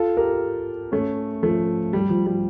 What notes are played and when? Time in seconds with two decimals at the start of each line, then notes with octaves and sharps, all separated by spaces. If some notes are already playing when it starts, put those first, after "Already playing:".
Already playing: F4 A4
0.17 G4 A#4
0.92 A3 C#4
1.43 F3 A3
1.93 G3
2.09 F3
2.26 G3